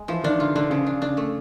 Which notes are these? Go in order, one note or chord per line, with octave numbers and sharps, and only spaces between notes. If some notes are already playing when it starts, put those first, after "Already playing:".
Already playing: G#3
E3 F3
D#3 D4
D3 F4
D3 D4
C#3 F3
D4
C#3 D4
A3